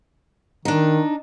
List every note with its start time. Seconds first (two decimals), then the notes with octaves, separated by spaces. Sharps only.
0.65 D#3 D4 D#4